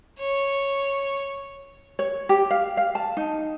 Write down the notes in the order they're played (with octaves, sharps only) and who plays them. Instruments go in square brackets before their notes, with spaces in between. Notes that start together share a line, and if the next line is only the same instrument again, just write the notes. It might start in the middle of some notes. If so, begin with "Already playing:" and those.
[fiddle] C#5
[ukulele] C#5
G4
F5
F5
A5
D#4